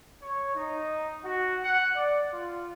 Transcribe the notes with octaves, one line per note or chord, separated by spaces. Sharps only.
C#5
D#4
F#4
F#5
D5
F4